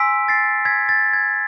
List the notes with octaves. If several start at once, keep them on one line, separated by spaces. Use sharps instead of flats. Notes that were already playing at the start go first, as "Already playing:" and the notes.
Already playing: G#5 C6 E6 B6 D7
A6 C7
G#5 C6 E6 G#6 B6
A6
G#6